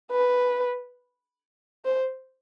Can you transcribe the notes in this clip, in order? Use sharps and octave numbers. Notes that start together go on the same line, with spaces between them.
B4
C5